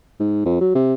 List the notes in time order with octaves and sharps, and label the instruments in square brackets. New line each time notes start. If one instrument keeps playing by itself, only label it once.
[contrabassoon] G#2
F2
F#3
C3